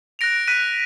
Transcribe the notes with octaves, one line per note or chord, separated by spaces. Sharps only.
F#6 A#6 D7 F7
F#6 B6 D#7